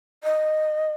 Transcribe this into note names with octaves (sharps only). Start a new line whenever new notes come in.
D#5